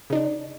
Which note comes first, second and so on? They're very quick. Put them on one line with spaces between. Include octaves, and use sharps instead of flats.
C#3 D#4 D4